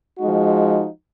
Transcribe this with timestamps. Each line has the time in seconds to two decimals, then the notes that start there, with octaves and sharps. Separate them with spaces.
0.19 F3 G#3 D#4 F#4